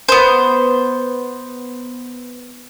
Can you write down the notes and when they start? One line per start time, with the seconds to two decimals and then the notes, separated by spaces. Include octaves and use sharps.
0.09 B3 C5